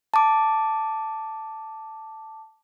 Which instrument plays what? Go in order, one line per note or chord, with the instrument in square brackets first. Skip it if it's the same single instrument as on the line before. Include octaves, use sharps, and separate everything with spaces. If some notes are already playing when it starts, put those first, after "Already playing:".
[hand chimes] A5 D6